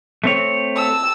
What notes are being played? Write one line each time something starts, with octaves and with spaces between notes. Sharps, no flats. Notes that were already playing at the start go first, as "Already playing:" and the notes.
A3 C4 C#5
A5 E6